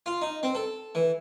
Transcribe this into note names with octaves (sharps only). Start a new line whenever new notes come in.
F4
D#4
C4
A4
E3